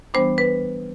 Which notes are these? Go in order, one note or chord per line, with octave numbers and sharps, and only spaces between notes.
E3 G3 B3 D4 C5
B4